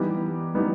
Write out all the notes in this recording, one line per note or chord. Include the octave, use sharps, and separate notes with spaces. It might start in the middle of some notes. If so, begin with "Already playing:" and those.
Already playing: E3 G3 B3 D#4 G4
E3 G3 B3 D#4 G4